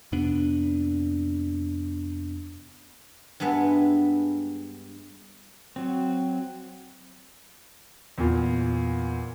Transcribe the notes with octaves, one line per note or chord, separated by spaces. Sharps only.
F2 C3 B3 D4
G2 G#3 B3 E5
F#3 C4
E2 A#2